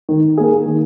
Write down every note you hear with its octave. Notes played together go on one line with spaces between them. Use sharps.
D#3
A#3 G#4
D#3